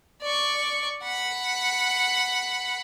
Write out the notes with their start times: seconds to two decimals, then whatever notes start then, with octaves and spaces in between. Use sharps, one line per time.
0.22 D5 C#6
1.03 F#5 B5